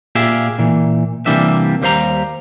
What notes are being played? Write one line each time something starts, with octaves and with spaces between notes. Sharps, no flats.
A#2 F4 G4 G#4 E5
A#2 E3
C3 E3 G3 A#3 D4 E5
D#2 G3 C5 F5 A#5